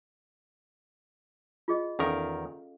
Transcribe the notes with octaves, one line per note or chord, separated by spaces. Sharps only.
F4 G#4 D#5
E2 D#3 C#4 A4 A#4 F5